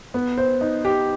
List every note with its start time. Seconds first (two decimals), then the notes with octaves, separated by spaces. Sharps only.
0.14 B3
0.38 C5
0.61 D#4
0.85 G4